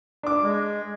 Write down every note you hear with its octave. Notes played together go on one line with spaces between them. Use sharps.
D4 D6
G#3